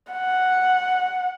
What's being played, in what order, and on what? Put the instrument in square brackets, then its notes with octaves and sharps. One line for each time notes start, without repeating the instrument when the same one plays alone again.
[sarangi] F#5